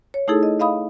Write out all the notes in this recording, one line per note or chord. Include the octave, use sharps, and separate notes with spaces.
C#5
A3 D#4 E4 G#4 A4
D#5
D#5 F5 B5 D#6